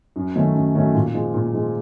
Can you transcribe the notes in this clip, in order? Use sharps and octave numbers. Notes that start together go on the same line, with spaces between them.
F#2
D#3 F#3 A3 C#4
F#2
D#3 F#3 A3 C#4
A#2
F3 G#3
A#2
F3 G#3